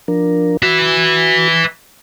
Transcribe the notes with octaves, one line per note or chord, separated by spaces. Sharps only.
F3 D4 A#4
F#4 B4 E5